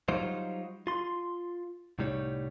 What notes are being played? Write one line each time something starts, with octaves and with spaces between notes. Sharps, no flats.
F#3 G3 D#4 F4 C5
F4 C6
C2 A2 G3 D#4 C#5